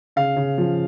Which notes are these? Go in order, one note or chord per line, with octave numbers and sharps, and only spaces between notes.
C#3 F5
C#3
F3